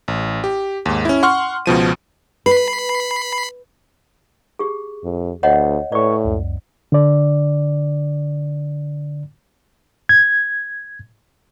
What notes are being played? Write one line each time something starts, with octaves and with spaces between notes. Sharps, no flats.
A1
G4
D#2 G#2
C#4 E4
F#5 C6 C#6 F6
C#2 B2 F3 D#7
B4 B5 C7
G4 G#4
F2
D2 C#5 D#5 F#5
A2 B4 C#5 D5 C#6
C#2 F#2
D3 D5
G#6